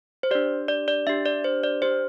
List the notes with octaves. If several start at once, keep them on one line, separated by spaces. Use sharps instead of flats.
C5
D4 G4 D5
D5
D5
D4 G4 E5
D5
C5
D5
D4 G4 C5